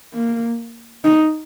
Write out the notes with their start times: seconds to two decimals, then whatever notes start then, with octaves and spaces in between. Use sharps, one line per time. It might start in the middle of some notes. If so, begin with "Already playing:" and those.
0.14 A#3
1.05 D#4